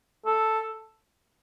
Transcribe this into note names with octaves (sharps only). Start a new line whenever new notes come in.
A4